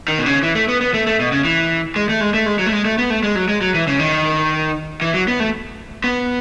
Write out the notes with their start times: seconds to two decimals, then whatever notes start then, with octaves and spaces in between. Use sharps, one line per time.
0.08 D#3
0.19 B2
0.26 C#3
0.43 E3
0.55 A3
0.68 B3
0.81 B3
0.94 A3
1.07 A3
1.19 B2
1.32 C#3
1.45 E3
1.96 G#3
2.09 A3
2.21 G#3
2.34 A3
2.46 G#3
2.59 F#3
2.66 A3
2.72 G#3
2.85 A3
2.98 B3
3.10 A3
3.23 G#3
3.35 F#3
3.49 G#3
3.61 F#3
3.74 E3
3.87 C#3
3.99 D#3
5.02 E3
5.14 F#3
5.28 B3
5.40 A3
6.04 B3